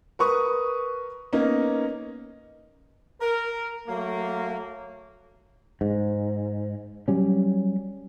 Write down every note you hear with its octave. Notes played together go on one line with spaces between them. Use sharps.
A#4 B4 C#6 D#6
A#3 B3 C#4 D#4
A#4
F#3 A3 A#3
G#2
F#3 G3 C#4